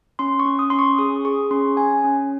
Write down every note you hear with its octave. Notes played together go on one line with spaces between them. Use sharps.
C#4 C6
C#6
C#4
D#6
C#4 C6
C#6
G#4 D#6
G#4 C#6
C#4 C6
C#4 G#5
C#4